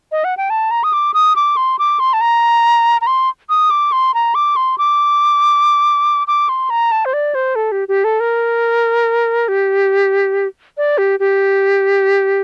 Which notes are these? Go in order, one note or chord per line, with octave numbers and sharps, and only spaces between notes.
D#5
F#5
G5
A5
A#5
D#6
D6
D#6
D6
C6
D6
C6
A5
A#5
A#5
C6
D#6
D6
C6
A#5
D6
C6
D6
D6
C6
A#5
A5
C5
D5
C5
A4
G4
G4
A4
A#4
G4
D5
G4
G4